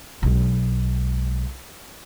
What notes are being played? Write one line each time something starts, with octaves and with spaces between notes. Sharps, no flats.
B1 G#3